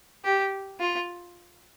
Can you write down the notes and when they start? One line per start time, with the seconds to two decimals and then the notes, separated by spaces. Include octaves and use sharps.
0.25 G4
0.80 F4